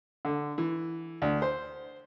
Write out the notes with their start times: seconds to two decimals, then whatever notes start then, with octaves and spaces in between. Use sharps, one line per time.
0.25 D3
0.58 E3
1.22 D2
1.42 C5